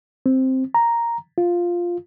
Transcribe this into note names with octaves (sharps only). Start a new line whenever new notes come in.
C4
A#5
F4